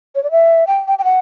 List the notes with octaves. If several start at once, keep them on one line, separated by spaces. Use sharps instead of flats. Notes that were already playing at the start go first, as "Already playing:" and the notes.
C#5
D5
E5
G5
G5
G5
F#5